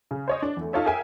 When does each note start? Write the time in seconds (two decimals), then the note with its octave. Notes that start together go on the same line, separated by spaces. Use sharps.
0.11 C#3
0.28 C5 C#5 D#5
0.42 D4
0.57 E2 A3
0.73 D#4 F4 A4 C#5 E5
0.86 G#4 A#4 E5 F5 G5 G#5